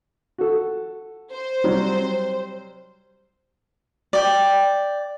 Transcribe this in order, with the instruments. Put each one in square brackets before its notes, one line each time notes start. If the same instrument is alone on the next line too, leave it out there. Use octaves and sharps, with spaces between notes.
[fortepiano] F#4 A4
[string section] C5
[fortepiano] C3 F#3 G3
[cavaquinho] D5 G5